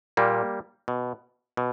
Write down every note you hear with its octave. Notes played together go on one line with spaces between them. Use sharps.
A#2 G3 A#3
B2
B2